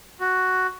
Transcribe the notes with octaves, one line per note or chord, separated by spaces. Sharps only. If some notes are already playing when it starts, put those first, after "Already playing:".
F#4